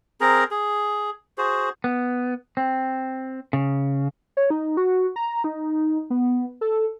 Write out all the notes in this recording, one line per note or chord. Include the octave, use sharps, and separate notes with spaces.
C4 G#4 A#4 A#5
G#4
F#4 G#4 C5
B3
C4
C#3
C#5
D#4
F#4
A#5
D#4
B3
A4